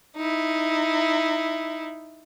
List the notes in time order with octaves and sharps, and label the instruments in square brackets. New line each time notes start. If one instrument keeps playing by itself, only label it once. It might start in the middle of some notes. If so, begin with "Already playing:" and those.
[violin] D#4 E4